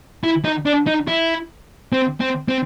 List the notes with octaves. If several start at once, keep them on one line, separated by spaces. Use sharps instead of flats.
E4
D#4
D4
D#4
E4
C4
C4
C4